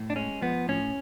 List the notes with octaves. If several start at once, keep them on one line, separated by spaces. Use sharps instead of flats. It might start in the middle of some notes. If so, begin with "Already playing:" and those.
Already playing: A2
D4
G#3 C#4
F3 B3
A2 C#4